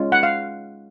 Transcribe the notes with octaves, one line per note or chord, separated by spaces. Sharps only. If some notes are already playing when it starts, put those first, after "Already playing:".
Already playing: G#3 C#4 F4
F#5
F5